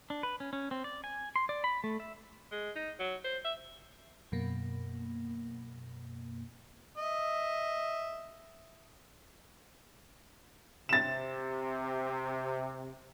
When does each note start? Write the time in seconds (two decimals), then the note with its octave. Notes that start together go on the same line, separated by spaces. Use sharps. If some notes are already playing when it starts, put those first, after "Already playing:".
0.10 D4
0.23 B4
0.40 C#4
0.53 C#4
0.71 C4
0.84 D5
1.04 G#5
1.36 C6
1.49 D5
1.64 B5
1.84 A3
2.00 E5
2.52 G#3
2.75 D#4
2.99 F#3
3.24 C5
3.45 E5
4.32 F#2 B2 A#3
6.98 D#5 E5
10.89 C3 A6 E7